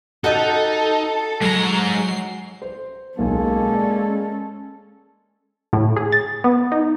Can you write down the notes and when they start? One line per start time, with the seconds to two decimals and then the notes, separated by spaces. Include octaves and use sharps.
0.24 D#4 F#4 G4 A4 D#5
1.41 G#2 F#3 A#5 C7
2.62 C5
3.18 B1 G#3 A#3 C#4 A4 G#5
3.72 D5 F5
5.73 A2
5.97 G#4
6.12 A6
6.44 B3
6.72 D#4